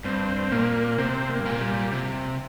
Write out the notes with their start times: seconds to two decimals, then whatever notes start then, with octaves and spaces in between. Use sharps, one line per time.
0.05 G2 C4
0.52 A#2 A#3
0.98 C3 C4
1.29 A#3
1.40 G2
1.45 A#2
1.61 G3
1.93 C3